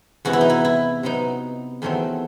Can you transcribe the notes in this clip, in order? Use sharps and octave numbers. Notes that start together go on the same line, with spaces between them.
E2 C3 E3 B3 F#4
E4
D#4
E4
E4
C3 F#3 B3 D#4
E2 D#3 F#3 A3 C4